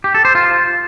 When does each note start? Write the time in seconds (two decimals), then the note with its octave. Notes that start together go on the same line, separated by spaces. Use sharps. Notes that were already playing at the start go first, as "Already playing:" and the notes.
0.04 G4
0.14 A4
0.25 C5
0.35 F4